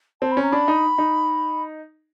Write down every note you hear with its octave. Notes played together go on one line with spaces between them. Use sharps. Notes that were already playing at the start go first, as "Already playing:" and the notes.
C4 A5
B5
C#4
A#5
D4 B5
D#4
D#4